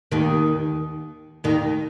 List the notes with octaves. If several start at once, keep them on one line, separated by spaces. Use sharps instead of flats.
D#2 D#3
D#2 D#3